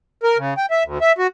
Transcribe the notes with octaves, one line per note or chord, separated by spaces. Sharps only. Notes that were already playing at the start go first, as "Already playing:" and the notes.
A#4
C#3
G5
E5
D2
E5
F#4